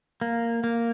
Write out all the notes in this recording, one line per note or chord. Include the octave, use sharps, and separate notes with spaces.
A#3
A#3